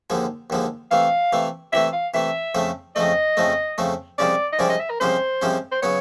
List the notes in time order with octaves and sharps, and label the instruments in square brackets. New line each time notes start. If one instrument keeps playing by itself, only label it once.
[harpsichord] D#2 D3 F3 G#3
D#2 D3 F3 G#3
[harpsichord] C3 E3 A3 [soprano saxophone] F5
[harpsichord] C3 E3 A3
[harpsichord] C3 E3 A3 [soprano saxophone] E5
[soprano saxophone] F5
[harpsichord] C3 E3 A3 [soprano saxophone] E5
[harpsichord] F2 C#3 F3 A3
[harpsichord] F2 C#3 F3 A3 [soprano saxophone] D#5
[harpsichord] F2 C#3 F3 A3
F2 C#3 F3 A3
[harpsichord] C2 C3 F3 G#3 C#4 [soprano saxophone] D5
[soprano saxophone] D#5
[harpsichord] C2 C3 F3 G#3 C#4 [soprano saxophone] D5
[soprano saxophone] D#5
E5
A#4
[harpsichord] C2 C3 F3 G#3 C#4 [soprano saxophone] C5
[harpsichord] C2 C3 F3 G#3 C#4
[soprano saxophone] C5
[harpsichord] C#3 F#3 B3 [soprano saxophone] C#5